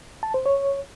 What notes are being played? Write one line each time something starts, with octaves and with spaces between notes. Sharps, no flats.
A5
C5
C#5